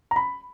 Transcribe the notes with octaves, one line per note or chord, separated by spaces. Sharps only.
A#5
B5